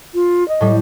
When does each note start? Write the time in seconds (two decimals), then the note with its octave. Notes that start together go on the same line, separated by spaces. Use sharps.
0.14 F4
0.48 D#5
0.61 A2 G3